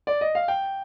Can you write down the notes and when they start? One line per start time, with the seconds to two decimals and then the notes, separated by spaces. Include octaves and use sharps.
0.07 D5
0.21 D#5
0.35 F5
0.48 G5